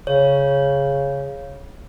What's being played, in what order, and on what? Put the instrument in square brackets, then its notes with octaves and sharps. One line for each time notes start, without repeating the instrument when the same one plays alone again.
[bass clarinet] C#3 [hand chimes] C#5